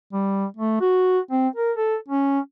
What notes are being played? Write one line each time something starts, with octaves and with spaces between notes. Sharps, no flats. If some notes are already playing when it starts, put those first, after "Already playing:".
G3
A3
F#4
C4
A#4
A4
C#4